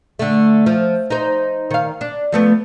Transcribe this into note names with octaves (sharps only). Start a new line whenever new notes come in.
D3 A3
F3
D#4 C5
D#3 F5
D4
F3 A3 B3